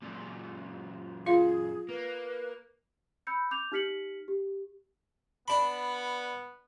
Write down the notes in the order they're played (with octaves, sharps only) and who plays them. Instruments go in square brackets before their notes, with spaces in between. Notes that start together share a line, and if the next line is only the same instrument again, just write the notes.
[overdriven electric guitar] F#2 A#2
[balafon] F4 F5 [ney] G#4
[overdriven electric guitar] A#3 [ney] B4
[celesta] B5 E6 G6 C#7
D6 G6 F7
D#4 G4 F6 B6 C#7 F#7
G4
[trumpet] B3 [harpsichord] D4 B5